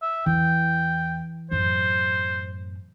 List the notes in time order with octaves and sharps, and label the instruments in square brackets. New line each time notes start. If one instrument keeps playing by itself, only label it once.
[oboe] E5
[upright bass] E2 [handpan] E3 [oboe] G5
[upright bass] F#2 A2 [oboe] C5